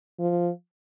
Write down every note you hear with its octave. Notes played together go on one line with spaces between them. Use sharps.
F3